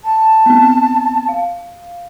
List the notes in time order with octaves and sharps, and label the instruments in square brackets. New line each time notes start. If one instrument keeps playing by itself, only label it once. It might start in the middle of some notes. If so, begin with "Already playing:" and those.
[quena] A5
[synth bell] B3 C4
F5